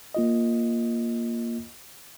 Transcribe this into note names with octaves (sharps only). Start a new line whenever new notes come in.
A#3 F4 D#5